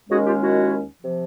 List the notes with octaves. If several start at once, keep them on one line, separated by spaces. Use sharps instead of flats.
D#2 D#3 G#3 C#4 F#4 G#4
F4 G4
E4 F#4
C3 F3